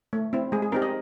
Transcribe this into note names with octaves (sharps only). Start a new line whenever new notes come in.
A3
C4 E4
G#3 G#4
G#4
C4 D#4 G4 A#4
D#5